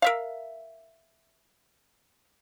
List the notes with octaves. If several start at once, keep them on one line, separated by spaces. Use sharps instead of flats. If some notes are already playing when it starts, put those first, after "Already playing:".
A#4 E5 F5